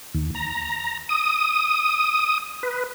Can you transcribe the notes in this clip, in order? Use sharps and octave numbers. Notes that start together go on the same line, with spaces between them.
D#2
A#5
D#6
B4